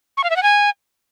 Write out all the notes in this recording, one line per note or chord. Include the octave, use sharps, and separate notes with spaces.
C#6
F5
E5
F#5
G#5